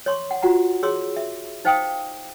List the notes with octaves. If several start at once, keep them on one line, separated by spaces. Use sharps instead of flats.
C#5 C6 C#6
F#5
F4 F#4 F#5 A#5
G#4 C#5 C6 D6 E6
E5
D#4 C5 F5 G5 D6 D#6